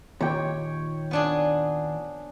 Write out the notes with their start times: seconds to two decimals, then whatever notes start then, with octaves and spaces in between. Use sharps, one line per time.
0.21 D#2 A#2 C#5 G5
1.11 B3 D4 G#4